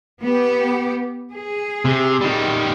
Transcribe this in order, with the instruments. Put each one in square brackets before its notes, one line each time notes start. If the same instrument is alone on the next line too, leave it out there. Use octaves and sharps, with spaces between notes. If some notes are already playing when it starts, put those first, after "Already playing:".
[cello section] B3 G4
G#4
[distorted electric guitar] C3
D#3 G3